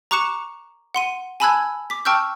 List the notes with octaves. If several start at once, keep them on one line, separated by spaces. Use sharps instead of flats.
A#5 C#6 D6 F#6 C#7 E7
F#5 C6 D#7
G#5 A5 B5 E6 F#6 G#6
D6 B6
G5 A5 C#6 E6 F6 G6